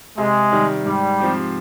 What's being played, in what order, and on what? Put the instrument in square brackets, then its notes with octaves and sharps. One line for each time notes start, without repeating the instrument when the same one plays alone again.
[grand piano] C3 [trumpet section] G#3
[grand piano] D#3 G3
[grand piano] G#2 [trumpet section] G3
[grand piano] F3 C4 G4